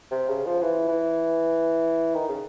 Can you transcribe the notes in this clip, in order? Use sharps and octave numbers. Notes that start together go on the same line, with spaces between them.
C3
C#3
F3
E3
E3
D#3
C#3